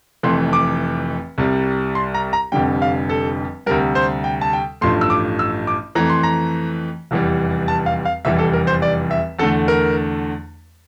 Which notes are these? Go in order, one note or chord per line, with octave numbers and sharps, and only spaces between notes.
F1 F2 E3 A3 C6
D6
C2 C3 G3
C6
A#5
A#5
F1 F2 D3 G3 G5
F5
A4
D2 C3 G3 A#4
C5
G5
A5
G5
A1 G2 F3 A3 C6
E6
D6
E6
D6
F2 E3 A3 A#5
C6
A#5
F1 E2 E3 G3
A5
F5
F5
F1 E2 E3 G3 E5
A4
A#4
C5
D5
E5
E2 D3 A3 A4
A#4